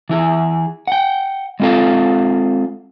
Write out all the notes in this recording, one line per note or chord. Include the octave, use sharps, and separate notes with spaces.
E3 E4 G#4
F#5 G5
G#3 C4 F4 A4 F5